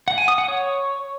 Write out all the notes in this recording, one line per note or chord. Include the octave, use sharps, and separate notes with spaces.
F#5
G#5
D#6
F#5
C#5